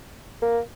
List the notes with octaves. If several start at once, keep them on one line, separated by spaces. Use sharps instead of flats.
A#3